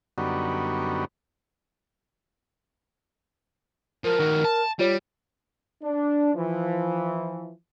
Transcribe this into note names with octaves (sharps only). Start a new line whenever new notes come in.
F#2 D3 G3 B3 D#4 F#4
F3 A#4
D#3 F#4
A5
G3 F4 C#5
D4
E3 F3